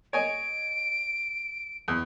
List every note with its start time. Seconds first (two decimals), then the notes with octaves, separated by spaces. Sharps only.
0.13 C#5 D#5 G#5 D7
1.88 E2